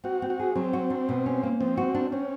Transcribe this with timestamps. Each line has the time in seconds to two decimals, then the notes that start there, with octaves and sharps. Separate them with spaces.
0.04 C4 F#4
0.22 C4
0.30 F#4
0.39 G#4
0.56 F#3 C4
0.73 F#4
0.90 D4
1.09 B2
1.26 C#4
1.43 A#3
1.60 F3 C4
1.77 F#4
1.94 D4
2.12 C4 C#4